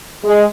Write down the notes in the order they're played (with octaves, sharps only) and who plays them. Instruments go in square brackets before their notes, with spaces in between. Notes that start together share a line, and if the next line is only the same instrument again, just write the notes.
[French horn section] G#3